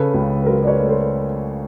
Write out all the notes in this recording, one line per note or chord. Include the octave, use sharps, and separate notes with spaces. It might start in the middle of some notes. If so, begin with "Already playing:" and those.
Already playing: C#3 A4 B4
C#2
B4
F#3 A#4 C5
D5
B4 C#5
A3
A#4 C5